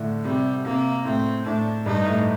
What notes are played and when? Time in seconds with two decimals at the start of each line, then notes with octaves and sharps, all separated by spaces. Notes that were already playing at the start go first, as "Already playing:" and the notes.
Already playing: A2 D3
0.25 C3 G3
0.65 C3 A#3
1.05 A2 C4
1.45 A2 D4
1.86 G2 D#4
2.06 A2